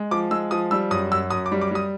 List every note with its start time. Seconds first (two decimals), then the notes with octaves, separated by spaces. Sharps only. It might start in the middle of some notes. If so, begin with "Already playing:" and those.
Already playing: G#3
0.11 F3 D6
0.31 G#3 E6
0.51 F3 D#6
0.71 G3 E6
0.91 F#2 D#6
1.11 F#2 E6
1.30 F#2 D#6
1.46 D6
1.52 G3
1.61 D6
1.71 G3 D#6